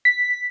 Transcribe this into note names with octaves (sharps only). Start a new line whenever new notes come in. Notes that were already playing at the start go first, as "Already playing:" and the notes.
B6